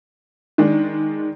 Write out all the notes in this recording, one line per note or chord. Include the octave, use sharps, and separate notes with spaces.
D#3 G#3 D4